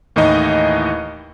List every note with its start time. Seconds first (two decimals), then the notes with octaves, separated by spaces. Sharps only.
0.16 D#2 A2 E3 D#4 D#5